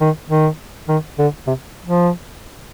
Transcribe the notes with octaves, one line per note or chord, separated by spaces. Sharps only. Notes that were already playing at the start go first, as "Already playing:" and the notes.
D#3
D#3
D#3
D3
C3
F3